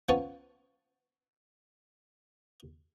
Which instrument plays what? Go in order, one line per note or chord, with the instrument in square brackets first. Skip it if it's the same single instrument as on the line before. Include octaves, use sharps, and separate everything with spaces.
[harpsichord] F3 B3 C#4 F4 C#5 A5